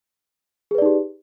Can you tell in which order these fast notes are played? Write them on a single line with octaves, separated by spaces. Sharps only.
G#4 B4 D5 D#4 G4